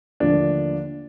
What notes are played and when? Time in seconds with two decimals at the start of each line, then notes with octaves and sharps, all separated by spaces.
0.20 D#2 D3 F3 A3 D4